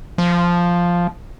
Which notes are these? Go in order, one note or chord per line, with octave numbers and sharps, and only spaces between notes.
F3